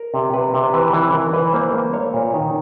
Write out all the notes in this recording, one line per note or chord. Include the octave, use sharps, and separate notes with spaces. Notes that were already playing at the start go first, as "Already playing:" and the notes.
Already playing: A#4
C3
C3 B4
C3
C5
E3 B4
E3 B4
E3 A#4
E3 B4
A#3 C5
A#3
A#3 C#5
A#2
D#3